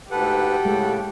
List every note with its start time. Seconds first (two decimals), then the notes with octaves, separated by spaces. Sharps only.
0.11 D2 G#2 G4 A4 B4 F#5
0.65 A2 C#3 G#3 A3